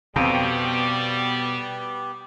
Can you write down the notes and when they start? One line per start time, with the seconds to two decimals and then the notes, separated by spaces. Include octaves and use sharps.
0.16 F2 B2 G3 B3 G4